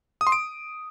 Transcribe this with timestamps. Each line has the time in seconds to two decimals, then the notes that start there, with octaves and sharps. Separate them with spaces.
0.21 D#6
0.27 C6
0.32 D7